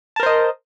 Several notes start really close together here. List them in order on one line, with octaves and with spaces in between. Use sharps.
A5 A#4 C5 D#5